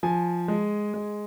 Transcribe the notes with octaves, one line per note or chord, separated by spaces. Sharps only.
F3 G#5
G#3
G#3